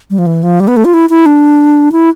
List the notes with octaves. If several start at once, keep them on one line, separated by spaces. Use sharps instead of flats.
G3
F3
E3
F3
G3
B3
A3
F4
E4
E4
D4
E4